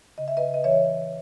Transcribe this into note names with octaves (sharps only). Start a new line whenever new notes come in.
C#3 D#5
E5
B4 D#5
D#5
E3 C#5 E5